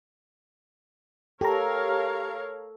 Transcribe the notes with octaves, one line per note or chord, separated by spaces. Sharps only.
G4 A4 A#4 C#5 F5 A#5